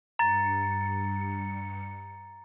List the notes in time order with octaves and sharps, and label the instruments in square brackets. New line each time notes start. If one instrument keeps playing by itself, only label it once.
[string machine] G2 C#7 [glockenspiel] A#5 A6